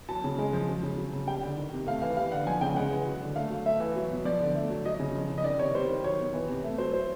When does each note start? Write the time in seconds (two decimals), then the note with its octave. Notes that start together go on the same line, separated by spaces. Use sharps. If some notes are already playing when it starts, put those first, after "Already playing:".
0.09 F#3 A5
0.24 C#3
0.39 G#3
0.53 F3
0.68 F#3
0.83 C#3
0.98 F#3
1.13 C#3
1.27 G3 G5
1.43 D3
1.57 D#3
1.73 C3
1.87 A3 F5
2.02 E3 F5
2.17 G3 F5
2.32 D3 F#5
2.47 F3 G#5
2.61 C#3 G5
2.76 G#3 F#5
2.91 E3
3.07 F#3
3.22 D3
3.36 A3 F5
3.50 F#3
3.66 A3 E5
3.80 E3
3.96 F#3
4.11 B2
4.25 F3 D5
4.41 D3
4.55 A3
4.70 F#3
4.85 F#3 D#5
5.00 C#3
5.15 F3
5.30 C#3
5.38 D#5
5.44 D#3 D5
5.59 C3 C#5
5.74 G3 C5
5.89 D#3
6.04 F#3 C#5
6.19 B2
6.34 E3
6.49 C3
6.64 A3
6.78 F#3 C5
6.93 F#3 C5